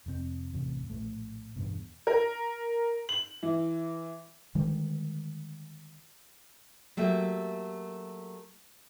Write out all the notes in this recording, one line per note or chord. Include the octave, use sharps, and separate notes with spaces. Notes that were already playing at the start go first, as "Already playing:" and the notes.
F1 F2 C3 C4
A1 E2 C3 A3
A#1 A2 A3
E2 G2 B2
A#4
F#7
E3
D3 D#3 G3 G#3
F#3 A3 A#3 G4 E5